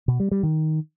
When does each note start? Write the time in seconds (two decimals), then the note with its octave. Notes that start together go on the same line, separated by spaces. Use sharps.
0.08 B2
0.20 G3
0.31 G3
0.43 D#3